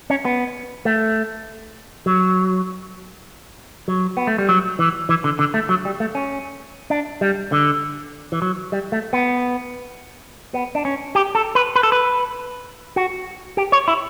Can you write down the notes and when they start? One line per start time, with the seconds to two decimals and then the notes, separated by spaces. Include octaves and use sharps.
0.10 C#4
0.25 B3
0.85 A3
2.06 F#3
3.88 F#3
4.17 B3
4.27 A3
4.38 G3
4.49 F#3
4.79 E3
5.09 E3
5.24 D3
5.39 D3
5.54 A3
5.69 F#3
5.85 G3
6.00 A3
6.15 C#4
6.90 D4
7.21 G3
7.52 D3
8.32 E3
8.42 F#3
8.72 G3
8.92 A3
9.13 B3
10.54 B3
10.75 D4
10.85 C#4
11.15 G4
11.35 A4
11.55 B4
11.76 B4
11.83 A4
11.92 B4
12.96 F#4
13.57 G4
13.72 C#5
13.88 E4